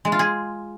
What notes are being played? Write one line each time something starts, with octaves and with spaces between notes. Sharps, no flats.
G#3
F4
G#4